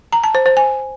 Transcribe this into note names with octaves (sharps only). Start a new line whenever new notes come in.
A#5
A5
C5
C5
G#5